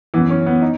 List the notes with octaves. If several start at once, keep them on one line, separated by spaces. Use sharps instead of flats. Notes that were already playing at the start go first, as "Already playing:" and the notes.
F#2 E3 B3
C#4
B3
D#4